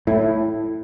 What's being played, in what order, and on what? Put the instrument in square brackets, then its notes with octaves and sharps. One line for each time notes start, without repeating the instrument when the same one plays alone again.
[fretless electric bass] A2 [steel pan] E4